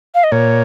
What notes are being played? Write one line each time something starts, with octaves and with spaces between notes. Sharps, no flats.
F5
D#5
A#2 C#5